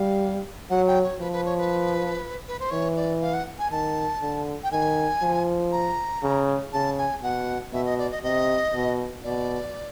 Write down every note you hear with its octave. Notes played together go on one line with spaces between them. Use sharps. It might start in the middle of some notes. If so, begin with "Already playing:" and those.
Already playing: G3 F5
F#3 F#5
G5
C#5
F3 B4
B4
C#5
B4
B4
C5
E3 C#5
D5
F5
F#5
G#5
D#3 A5
D3
G5
D#3 G#5
F3
A#5
C#3
C#3 A5
G#5
B2 F#5
B2 E5
D#5
D5
D#5
C3 D#5
B2
B2 D5